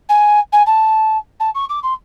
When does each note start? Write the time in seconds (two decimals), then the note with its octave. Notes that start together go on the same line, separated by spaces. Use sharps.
0.09 G#5
0.52 G#5
0.66 A5
1.40 A5
1.54 C#6
1.69 D6
1.83 C6